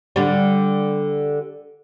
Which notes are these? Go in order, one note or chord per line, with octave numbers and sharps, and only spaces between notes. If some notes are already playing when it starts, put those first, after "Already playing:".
D3 G3